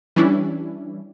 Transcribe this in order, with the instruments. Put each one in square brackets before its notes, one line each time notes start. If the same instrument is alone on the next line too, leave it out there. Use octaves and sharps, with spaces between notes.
[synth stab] E3 G3 C#4 D4 E4